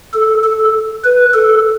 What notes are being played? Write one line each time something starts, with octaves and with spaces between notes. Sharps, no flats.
A4
A4
B4
A4